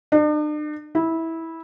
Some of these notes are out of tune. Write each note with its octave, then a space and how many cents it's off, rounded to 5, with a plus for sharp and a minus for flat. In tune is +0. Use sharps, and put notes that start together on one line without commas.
D4 +45
E4 -15